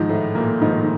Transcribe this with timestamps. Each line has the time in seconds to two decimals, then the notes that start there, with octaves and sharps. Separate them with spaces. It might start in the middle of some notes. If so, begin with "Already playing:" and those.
Already playing: G#2 D#3 F3 D#4
0.09 A2 A3
0.35 A#2 A#3
0.61 G#2 D#3 F3 D#4